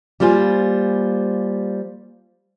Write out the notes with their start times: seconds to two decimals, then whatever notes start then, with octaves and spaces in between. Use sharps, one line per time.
0.20 G3 A#3 F4 C5 G#5